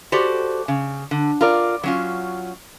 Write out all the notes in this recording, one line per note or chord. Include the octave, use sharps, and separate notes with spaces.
F#4 G4 A4 C5 D5
C#3
D3
F4 A#4 D5
F#3 C#4 F4